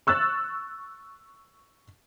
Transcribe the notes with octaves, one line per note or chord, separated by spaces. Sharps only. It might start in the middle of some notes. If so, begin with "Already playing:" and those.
C#6 E6 F#6 A6